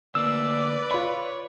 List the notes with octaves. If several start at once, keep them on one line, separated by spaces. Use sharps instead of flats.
D2 A#3 B4 D5 E6
F4 C#5 B5